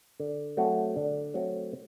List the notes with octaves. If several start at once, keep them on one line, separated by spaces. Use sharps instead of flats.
D3
F#3 A3 C4 F#4
D3
F#3 A3 C4 F#4